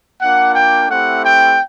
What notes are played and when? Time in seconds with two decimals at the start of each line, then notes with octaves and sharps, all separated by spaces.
0.21 A#3 D4 F4 F#5
0.55 G5
0.90 A3 C4 E4 G4 F#5
1.24 G5